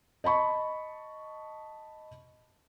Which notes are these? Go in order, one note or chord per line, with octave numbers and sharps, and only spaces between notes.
D#5 A5 B5 C#6